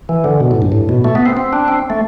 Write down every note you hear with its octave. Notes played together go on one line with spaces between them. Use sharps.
E3
D3
B2
A2
G2
A2
B2
A3
B3
C4
C4
D4
C4
A3